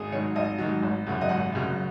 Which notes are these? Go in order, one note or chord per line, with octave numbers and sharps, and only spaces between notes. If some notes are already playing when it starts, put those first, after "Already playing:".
Already playing: G#1 G#4
G#2 D#3 F#3 C#5
G#1 D#5
G#2 D#3 F#3
G#1
F#2 C#3 F#3
D#5
G#1 F#5
F#2 C#3 F#3